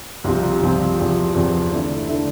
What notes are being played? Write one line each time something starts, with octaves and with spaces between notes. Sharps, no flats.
C2 C3 F3 C4 F4
C2 C3 F3 C4 F4
E2 C3 F3
E2 C3 F3
D3 A3 E4
D3 A3 E4